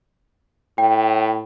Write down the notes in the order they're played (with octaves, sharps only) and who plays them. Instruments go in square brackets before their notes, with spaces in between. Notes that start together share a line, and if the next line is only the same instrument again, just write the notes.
[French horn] A2 [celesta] G5